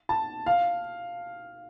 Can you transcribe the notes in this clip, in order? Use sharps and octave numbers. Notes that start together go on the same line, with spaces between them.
A5
F5